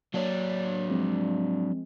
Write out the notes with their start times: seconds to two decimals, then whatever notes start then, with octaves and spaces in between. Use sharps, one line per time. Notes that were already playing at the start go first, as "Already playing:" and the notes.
0.14 F#3 A#3 D4 C#5
0.89 F3 G#3 C4